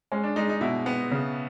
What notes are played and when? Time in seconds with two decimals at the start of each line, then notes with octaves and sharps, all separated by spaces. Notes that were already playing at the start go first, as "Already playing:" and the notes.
0.12 G#3 C#4
0.23 D4
0.36 G#3 D#4
0.50 D#4
0.61 B2 E4
0.86 B3
1.11 C#3